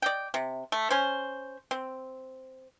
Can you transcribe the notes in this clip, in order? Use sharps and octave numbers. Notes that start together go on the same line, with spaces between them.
D5 D#5 G5
C3
A3
C#4 C5
C4